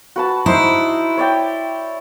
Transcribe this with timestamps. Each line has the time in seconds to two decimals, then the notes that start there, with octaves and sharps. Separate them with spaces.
0.16 F#4 B4 A5
0.46 D#4 E4 C5
1.17 C#5 D5 G5